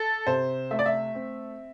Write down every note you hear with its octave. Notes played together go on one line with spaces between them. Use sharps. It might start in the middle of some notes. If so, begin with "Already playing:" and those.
Already playing: A4
C3 C5
A3 E5
D5
E5
C4